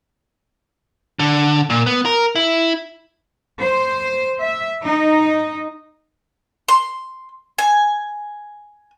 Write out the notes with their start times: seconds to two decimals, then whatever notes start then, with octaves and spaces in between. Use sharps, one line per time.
1.19 D3
1.70 A#2
1.86 B3
2.05 A#4
2.36 E4
3.60 C5
4.40 E5
4.84 D#4
6.68 C6
7.58 G#5